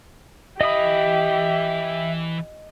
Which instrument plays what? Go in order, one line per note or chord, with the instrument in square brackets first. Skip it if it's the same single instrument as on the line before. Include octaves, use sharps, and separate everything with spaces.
[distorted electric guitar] E3 B5 [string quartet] G4 [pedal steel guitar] D#5 D#6 [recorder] E5